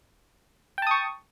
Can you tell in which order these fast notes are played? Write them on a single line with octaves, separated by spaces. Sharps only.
G5 A5 D#6 C#6